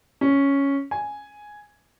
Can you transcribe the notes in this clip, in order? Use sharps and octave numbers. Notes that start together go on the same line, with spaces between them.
C#4
G#5